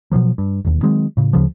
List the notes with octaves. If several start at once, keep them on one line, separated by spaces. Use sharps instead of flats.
B2 D3 F3 F#3
G2
E1 D#2
D#3 F#3 G#3 C4
A2 C#3
D2 C#3 F3